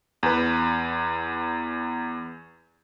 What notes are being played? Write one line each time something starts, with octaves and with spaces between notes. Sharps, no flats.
E2 B4